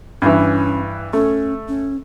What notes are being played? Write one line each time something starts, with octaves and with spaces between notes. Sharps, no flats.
G2 E3 C#4
A3 C#4
C#4